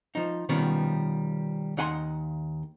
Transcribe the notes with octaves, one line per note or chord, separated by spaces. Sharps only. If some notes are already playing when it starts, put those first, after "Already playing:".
F3 D#4
B2 D#3 F3 G3 B3 C#4
D#2 D#4 F#5 G#5 C6